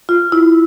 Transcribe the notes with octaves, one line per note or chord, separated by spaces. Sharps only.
F4
E4